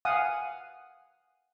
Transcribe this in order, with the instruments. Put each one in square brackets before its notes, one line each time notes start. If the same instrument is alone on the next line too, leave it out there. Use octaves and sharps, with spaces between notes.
[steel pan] F5 F#5 G#5 D#6